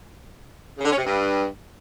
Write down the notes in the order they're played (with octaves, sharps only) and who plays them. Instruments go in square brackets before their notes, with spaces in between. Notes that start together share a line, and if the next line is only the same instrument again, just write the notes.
[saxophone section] C#3
D3
C#4
C3
G2